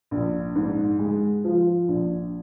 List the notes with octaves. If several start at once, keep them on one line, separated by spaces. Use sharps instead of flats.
A#1
G#2
G#3
F3
A#1